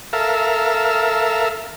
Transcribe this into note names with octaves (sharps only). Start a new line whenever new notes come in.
A4 A#4 E5 F5